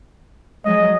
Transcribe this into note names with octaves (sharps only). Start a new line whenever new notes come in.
F#3 G#3 D#5